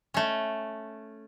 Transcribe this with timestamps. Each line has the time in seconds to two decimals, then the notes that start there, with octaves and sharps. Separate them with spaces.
0.14 A3 C#4